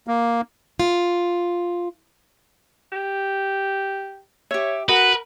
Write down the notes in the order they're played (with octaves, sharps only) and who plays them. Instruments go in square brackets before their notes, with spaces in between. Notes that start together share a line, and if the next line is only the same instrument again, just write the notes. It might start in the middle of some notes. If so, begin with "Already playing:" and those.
[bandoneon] A#3
[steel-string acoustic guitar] F4
[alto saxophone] G4
[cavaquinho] G4 E5 [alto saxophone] C#5
[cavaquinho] F#4 F#5 D#6 [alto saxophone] A#4 [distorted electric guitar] B4